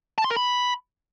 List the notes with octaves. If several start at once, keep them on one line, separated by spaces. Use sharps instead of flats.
A5
C6
A#4
B5